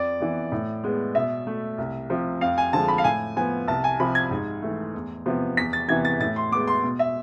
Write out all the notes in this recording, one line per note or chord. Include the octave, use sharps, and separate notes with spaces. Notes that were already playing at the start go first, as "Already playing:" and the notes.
Already playing: F2 D5
E3 B3
A2
G#3 B3
B2 E5
A3
C2
C3 F3
F2 F5
G#5
D3 F3 G#3 A5
B5
F5
A2 G#5
F3 B3 G#5
C2 A5
G#5
C3 F3 B5
G#6
G#2
E3 A3
E2
C3 F3 B3
E2 B6
A6
C3 E3 B3 G#6
A6
A2 A6
C6
G#3 B3 D6
C6
B2
E5